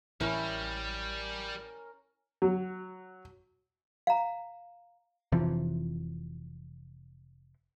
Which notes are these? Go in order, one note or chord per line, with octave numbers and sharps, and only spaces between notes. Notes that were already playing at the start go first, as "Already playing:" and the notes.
A1 G3 C#4 E4 A#4 C#5
F#3
F5 A#5
F1 C3 E3 F3